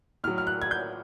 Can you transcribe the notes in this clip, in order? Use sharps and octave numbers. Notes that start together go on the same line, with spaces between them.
A2 F#3 F6
F6
F#6
G#6
G6